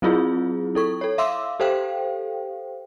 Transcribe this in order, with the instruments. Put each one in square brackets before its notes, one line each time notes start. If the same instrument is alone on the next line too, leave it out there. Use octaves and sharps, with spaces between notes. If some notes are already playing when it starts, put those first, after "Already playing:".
[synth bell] F#3 C4 E4 F4 G#4
E4 A4 C#6
A4 C#5
E5 F5 C6 D6 E6
G4 A4 C5 F5 G5